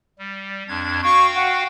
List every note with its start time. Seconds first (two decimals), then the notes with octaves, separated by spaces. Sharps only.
0.19 G3
0.69 F2 D4 G#6
1.03 F#4 F5 G5 C#6
1.35 F#5